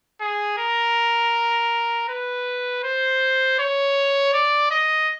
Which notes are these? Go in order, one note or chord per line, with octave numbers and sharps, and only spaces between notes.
G#4
A#4
B4
C5
C#5
D5
D#5